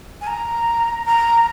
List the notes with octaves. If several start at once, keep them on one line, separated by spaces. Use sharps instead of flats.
G#5
A#5
A#5